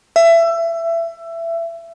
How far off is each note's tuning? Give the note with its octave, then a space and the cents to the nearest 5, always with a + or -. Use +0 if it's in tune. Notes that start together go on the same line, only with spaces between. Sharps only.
E5 +20